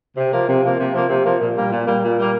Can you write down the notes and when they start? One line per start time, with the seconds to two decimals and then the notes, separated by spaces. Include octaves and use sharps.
0.17 C3
0.32 F3 A#3
0.48 C3
0.62 F3 A#3
0.79 C3
0.94 F3 A#3
1.10 C3
1.25 F3 A#3
1.40 A#2
1.56 G3 A#3
1.71 A#2
1.87 G3 A#3
2.03 A#2
2.18 G3 A#3